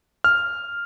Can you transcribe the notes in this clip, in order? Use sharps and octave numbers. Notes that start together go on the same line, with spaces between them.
F6